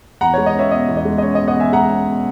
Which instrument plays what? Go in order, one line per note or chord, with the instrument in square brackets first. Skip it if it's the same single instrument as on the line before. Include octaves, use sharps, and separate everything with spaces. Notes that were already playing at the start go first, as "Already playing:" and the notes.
[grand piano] E2 F#5 A#5
C#5
G#3
D#5
C#4 C#5 E5
B2 D#5
E2
D#5
G#3
D#5
C#4 C#5
D#5
B2
D#5 F#5
E2 E5 G#5
G#3 F#5 A#5
C#4
B2